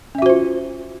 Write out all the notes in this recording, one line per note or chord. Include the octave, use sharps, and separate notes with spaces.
C#4 F4 F#4 C5 E5